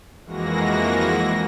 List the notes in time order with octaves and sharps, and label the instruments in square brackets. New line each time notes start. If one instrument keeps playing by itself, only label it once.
[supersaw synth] F2 E3 G#3 A#3 F#4 A#6